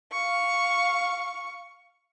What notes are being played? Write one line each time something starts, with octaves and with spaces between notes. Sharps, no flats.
F5 C#6